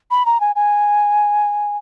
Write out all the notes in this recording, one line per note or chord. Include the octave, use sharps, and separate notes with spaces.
B5
A#5
G#5
G#5